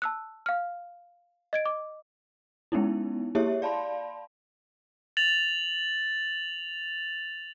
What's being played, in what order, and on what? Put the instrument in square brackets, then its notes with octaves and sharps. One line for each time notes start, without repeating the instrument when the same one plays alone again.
[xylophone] A5 E6 F#6
F5 F6
D#5 G#6 D7
D6
[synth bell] G#3 B3 C#4 D#4 E4
A#3 E4 G4 G#4 C#5 E5
D5 F5 A5 B5 C6
[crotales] A6 F7 F#7